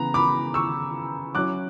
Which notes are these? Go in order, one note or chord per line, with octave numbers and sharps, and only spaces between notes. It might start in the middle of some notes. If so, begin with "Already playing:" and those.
Already playing: C#3 E3 B3 A#5
B5 D6
C#6 E6
F#3 C#4 E4 D6 F#6